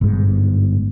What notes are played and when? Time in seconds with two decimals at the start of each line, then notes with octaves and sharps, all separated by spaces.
0.01 G1 G#2